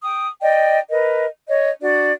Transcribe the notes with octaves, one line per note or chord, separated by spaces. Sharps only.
G5 D#6
D5 D#5 G5
A#4 B4 D#5
C#5 D#5
D4 F#4 D5